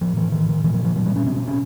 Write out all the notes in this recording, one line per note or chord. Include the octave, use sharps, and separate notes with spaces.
A2 F3
E3
D#3
D#3
A#2 E3
F3
F3
F#3
G3
C#4
B2 C4
C#4
C#4